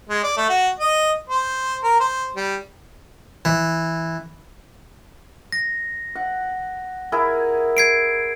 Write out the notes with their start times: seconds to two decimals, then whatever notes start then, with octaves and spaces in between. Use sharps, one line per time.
0.09 G#3
0.23 D5
0.37 A3
0.49 F#4
0.79 D#5
1.30 C5
1.84 A#4
2.00 C5
2.36 G3
3.45 E3
5.52 A#6
6.15 F#5
7.12 E4 G#4 A#4
7.77 G#6 C7 D7